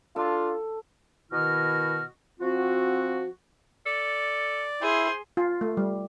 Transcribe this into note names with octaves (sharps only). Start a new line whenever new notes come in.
D4 F4 A4
B2 D#3 E4 F#4 D#5 F6
F3 C4 F4 F#4
A4 D5
E4 G#4 C5 C6
F4
A3
G3